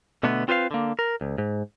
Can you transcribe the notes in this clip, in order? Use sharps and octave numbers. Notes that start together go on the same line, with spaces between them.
B2 D3 A3 B3
C4 F4 B4 C5 D#5 F5
D3 A#3
A#4
C#2
G#2